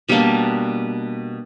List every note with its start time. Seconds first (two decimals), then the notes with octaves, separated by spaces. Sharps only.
0.09 B2 G3 A#3 D4